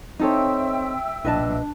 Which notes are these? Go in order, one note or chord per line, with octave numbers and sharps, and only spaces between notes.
C4 D#4 A4 C#5 E5 G5 E6
B1 A#2 D4 B4 D#5 A5